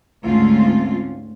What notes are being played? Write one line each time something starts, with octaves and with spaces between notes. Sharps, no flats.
D2 G#2 C4 C#4 F4